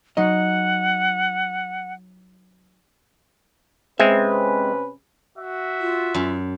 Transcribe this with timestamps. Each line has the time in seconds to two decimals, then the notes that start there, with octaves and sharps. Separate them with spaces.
0.17 F#3 D#4 D#5 F#5
4.00 C3 G#3 C4 C#4 B4 E5
5.38 F#4 E5
5.80 F4
6.14 F#2